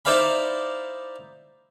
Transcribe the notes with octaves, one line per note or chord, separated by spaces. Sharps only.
D#4 E4 C5 D5 F5 B5